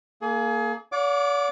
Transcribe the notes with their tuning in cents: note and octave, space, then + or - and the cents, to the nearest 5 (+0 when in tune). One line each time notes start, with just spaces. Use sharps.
A#3 -10 G#4 +30
D5 -45 F#5 -45 D6 +0